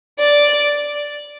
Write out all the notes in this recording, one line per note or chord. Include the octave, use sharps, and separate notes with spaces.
D5